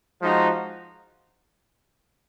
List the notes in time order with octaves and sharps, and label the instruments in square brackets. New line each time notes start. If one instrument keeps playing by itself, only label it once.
[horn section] F3 G#3 D#4 F#4